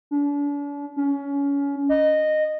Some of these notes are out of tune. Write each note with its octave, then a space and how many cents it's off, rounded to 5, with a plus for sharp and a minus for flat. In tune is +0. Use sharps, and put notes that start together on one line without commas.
D4 -40
C#4 +25
D#5 -15